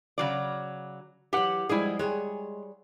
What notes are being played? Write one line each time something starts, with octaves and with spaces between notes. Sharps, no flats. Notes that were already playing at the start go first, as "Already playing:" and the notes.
C#3 F#3 D5
E3 F#3 G4 F#5
F3 G3 G#3 E4 G#4
G3 G#3 G#4 C#5